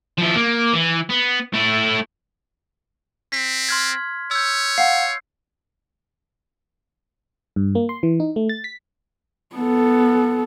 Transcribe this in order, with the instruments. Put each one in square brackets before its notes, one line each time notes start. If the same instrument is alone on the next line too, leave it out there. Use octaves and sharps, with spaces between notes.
[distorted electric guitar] F3 E4
A#3
E3
B3
A3 E4
[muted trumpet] C4 [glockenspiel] B6
[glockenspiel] C6 F6 G#6
[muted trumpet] C#5 [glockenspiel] E6 G6
[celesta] F5 F#5 [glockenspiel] C7
[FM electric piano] G2
A#3
C6
E3
D#4
A3
A6
B6
[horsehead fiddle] B3 A4